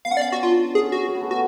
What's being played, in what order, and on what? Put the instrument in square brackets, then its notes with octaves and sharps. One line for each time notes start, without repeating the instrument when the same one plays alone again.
[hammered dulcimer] B3 [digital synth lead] F5
[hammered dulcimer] C#4 [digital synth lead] F#5
[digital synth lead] D5
F5
F#4
[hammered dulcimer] D4 [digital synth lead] F4
[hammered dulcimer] C#4 [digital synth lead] G#4
[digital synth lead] F#4
[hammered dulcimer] C#4
B3
A3
[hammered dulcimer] B3 [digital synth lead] F#4